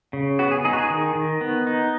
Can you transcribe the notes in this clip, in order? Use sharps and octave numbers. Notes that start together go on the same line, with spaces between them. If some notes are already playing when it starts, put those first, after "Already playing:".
C#3
B3 F#4
G#4
D#4 G#4
F#4
G#4
D#3
D#3
B3
D#4